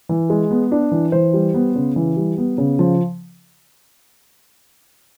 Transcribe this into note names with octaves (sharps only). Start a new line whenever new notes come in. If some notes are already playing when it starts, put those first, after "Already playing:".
E3
G#3
B3
D4
E3
E3 C5
G3
B3
C#3
E3
G3
B3
C#3
F3